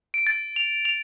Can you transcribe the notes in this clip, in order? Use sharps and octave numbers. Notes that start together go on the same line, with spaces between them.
D7
A6
F7
F7